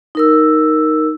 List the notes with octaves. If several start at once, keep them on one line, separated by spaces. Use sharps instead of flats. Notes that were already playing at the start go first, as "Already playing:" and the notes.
D#4 A#4 E6